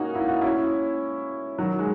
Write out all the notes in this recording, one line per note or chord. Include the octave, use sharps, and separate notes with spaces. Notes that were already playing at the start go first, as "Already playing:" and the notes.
Already playing: A#3 C#4 D#4 F#4
E4
F#4
C#4 E4
D#3 F#3
G#3